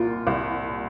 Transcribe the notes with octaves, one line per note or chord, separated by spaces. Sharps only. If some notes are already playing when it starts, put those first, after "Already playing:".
Already playing: C2 A#2 F4 A#4
C2